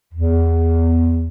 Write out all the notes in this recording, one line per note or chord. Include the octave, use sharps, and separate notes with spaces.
E2